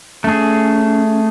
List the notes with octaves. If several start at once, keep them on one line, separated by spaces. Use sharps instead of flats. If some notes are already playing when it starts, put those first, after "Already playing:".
A3 C#4 G#4